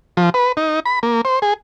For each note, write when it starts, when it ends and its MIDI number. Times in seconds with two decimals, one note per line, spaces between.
0.17 0.30 53
0.34 0.52 71
0.57 0.80 63
0.86 0.99 83
1.03 1.21 58
1.25 1.39 72
1.42 1.54 68